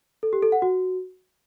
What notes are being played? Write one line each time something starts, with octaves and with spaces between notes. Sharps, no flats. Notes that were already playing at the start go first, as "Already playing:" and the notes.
A4
G4
A4
F#5
F#4